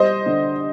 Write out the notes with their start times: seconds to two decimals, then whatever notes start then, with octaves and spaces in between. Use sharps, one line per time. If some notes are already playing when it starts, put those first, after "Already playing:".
Already playing: G3 C5 D#5
0.26 D3